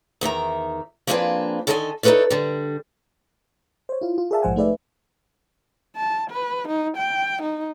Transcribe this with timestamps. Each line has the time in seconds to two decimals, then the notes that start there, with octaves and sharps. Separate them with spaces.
0.21 E2 D#3 E5 A#5
1.07 F3 A#3 C4 D4 G#4 B4
1.67 D3 D#3 A4 D#5 F5 G#5
2.03 D#4 E4 A4 B4 C#5 D5
2.30 D3 G3
3.89 C5 C#5
4.01 E4 F4
4.18 F4
4.31 G#4 A#4 D5 E5 F5 A5
4.42 A#1 G#2 F3 C5 F#5 G#5
4.56 A3 D#4 G#4 B4 D5 E5
5.96 A5
6.30 B4
6.68 D#4
6.97 G5
7.42 D#4